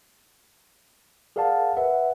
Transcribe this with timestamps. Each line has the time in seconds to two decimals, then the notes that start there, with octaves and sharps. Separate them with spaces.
1.36 G#4 A#4 D5 F5 F#5 A5
1.77 B4 E5 F#5